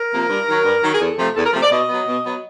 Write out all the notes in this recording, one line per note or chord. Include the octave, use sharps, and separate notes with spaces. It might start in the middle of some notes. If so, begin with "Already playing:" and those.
Already playing: A#4
C3 F3 A#3
G2
D#3 F#3
G2
D#3 F#3
G#4
E2 A4
C3 F3 A3
E2 A4
A#4
C3 F3 A3 C5
D5
B2 D#5
F#3 B3
B2
F#3 B3